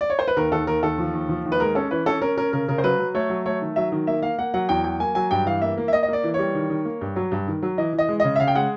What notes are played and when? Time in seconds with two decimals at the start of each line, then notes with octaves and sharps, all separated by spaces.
0.01 D5
0.10 C#5
0.19 C5
0.28 B4
0.36 D#2 A#4
0.52 D#2 A4
0.67 D#2 A#4
0.83 D#2 A4
0.98 F3
1.13 D#2
1.29 F3
1.45 D#2
1.52 B4
1.60 G#3 A#4
1.75 C#4 A4
1.91 E3 B4
2.06 C#4 A4
2.21 C#4 A#4
2.37 C#4 A#4
2.53 C#3 A#4
2.68 C#3 A#4
2.78 C5
2.83 F#3 B4
2.99 F#3
3.14 A3 C#5
3.30 F#3
3.46 A3 C#5
3.61 D#3
3.76 F#3 E5
3.92 D#3
4.07 A#3 E5
4.22 A#3 F5
4.38 A#3 F#5
4.54 F#3 F#5
4.69 E2 G5
4.84 F#3 G5
5.00 A#3 G#5
5.15 F#3 G#5
5.31 G2 G5
5.46 E3 F5
5.62 A#3 E5
5.77 A#3
5.88 E5
5.92 A#3 D#5
6.03 D#5
6.08 A#3 D5
6.24 E3
6.34 C#5
6.39 G3
6.55 D#3
6.70 D#3
6.85 A#3
7.01 G2
7.16 F#3
7.32 G2
7.47 D#3
7.63 F#3
7.78 E3 D#5
7.93 E3
7.98 D#5
8.09 G#3
8.20 C#3 D#5
8.36 E5
8.39 C#3 F5
8.48 G5
8.55 G#3 F#5